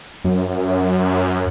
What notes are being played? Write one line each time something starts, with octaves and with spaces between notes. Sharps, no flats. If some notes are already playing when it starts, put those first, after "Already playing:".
F#2